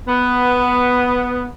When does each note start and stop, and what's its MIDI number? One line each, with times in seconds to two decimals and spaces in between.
0.07 1.45 59